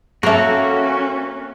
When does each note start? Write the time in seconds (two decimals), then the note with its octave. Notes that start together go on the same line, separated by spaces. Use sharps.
0.23 A#3 C#4 F#4 A4 A#4 E5